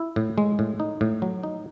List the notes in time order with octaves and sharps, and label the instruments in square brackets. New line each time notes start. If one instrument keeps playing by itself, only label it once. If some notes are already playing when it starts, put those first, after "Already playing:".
Already playing: [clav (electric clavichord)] E4
A2
G#3
A2
D#4
A2
F#3
D#4